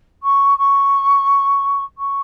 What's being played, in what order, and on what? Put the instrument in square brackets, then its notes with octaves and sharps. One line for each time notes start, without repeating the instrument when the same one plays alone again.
[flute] C#6
C#6
C#6